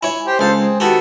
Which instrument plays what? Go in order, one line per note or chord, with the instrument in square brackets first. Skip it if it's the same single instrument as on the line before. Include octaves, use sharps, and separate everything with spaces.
[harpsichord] E4 C#5 [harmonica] G#5
[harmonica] G4 C5
[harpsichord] C#2 F5 [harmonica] G#4 A4 C5
[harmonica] C4 G#4
[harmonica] D#3 B3 A4 [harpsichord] F#4 G4